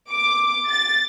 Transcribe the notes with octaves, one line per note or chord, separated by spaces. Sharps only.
D6
A6